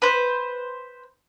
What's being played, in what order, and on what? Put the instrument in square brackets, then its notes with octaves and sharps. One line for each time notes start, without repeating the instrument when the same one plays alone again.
[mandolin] B4 C5